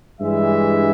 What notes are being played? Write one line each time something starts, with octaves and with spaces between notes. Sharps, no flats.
G2 E3 G#3 E5